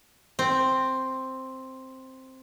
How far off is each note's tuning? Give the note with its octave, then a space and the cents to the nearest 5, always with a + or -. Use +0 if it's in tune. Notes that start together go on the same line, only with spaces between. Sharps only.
C4 +5